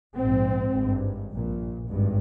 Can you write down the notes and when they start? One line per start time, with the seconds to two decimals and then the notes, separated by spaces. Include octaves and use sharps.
0.15 A#1 G#2 C4
0.72 G#1
0.77 G2
1.31 A#1 A#2
1.89 G#1 G2